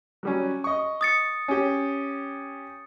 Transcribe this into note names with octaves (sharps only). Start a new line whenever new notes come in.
F#3 G3 C#4
D#5 C#6
D#6 A6 C#7
C#4 G4